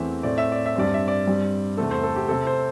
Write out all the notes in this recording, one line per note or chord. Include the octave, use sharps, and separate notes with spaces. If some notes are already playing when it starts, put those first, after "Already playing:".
Already playing: E2 E3 A3 C4 E5
A2 A3 C4 D5
E5
D5
E5
G2 G3 C4 D5
E5
D5
G2 G3 C4
E2 C3 A3 C4 A4
C5
A4
G4
C3 A3 C4 A4
C5